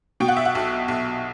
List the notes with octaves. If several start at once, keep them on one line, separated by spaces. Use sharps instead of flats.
B2 G5
F#5
E5
F#5
B1
B1